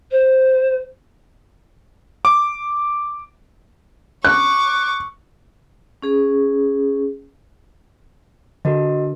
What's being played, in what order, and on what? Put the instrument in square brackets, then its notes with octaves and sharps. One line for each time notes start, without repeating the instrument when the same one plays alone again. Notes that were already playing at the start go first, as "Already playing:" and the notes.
[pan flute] C5
[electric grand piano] D6
[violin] C#6 D6 [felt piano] F#6
[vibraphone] C#4 G#4
[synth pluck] D3 [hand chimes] F#4 A#4 D#5